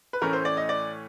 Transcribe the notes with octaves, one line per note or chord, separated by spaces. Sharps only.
B4
A2 E3 A3 C#4 A#4
C5
D5
D#5
D5